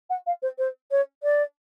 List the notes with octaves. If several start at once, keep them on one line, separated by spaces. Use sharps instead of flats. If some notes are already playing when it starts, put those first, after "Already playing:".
F#5
F5
C5
C5
C#5
D5